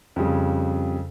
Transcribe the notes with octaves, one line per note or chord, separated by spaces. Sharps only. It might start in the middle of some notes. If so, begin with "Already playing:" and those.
F2 C#3 G3